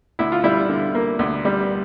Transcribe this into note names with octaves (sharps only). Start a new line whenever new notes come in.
D2 E4
F4
G3 E4
D3
A#3
D2
G3